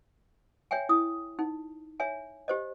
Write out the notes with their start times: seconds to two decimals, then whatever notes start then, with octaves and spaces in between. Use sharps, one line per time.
0.71 C#5 E5 G5 G#5
0.89 E4 D#6
1.39 D#4
2.00 C#5 E5 G#5
2.48 G4 C5 D#5